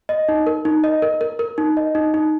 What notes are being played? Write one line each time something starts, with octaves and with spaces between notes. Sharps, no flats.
D#5
D#4
A#4
D#4
D#5
A#4
A#4
A#4
D#4
D#5
D#4
D#4